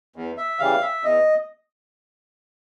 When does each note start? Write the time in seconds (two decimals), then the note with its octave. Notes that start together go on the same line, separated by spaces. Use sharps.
0.16 E2
0.37 E5
0.59 C#3 E3 G3 F5
0.81 E5
1.03 E2 D#5